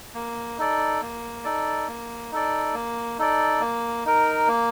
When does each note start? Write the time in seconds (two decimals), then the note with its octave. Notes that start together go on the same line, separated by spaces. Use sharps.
0.14 A#3
0.58 D#4 A4 D5
1.02 A#3
1.44 D#4 A4 D5
1.88 A#3
2.32 D#4 A4 D5
2.74 A#3
3.19 D#4 A4 D5
3.61 A#3
4.05 D#4 A#4
4.48 A#3